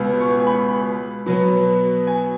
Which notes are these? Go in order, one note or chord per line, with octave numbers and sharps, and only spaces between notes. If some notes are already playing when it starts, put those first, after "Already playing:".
Already playing: C#2 B2 B3
C#6
G#5
B5
B2 F#3 B3
G#5